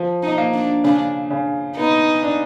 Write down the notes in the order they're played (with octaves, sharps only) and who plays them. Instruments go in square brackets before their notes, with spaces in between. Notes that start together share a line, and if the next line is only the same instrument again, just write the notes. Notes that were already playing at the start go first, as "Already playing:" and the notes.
Already playing: [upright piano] F3
[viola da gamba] D#4
[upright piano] A#3
[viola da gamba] D4
[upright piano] C#3 [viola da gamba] D4
[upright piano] C#3
[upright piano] B3 [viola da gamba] D#4
[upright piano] D4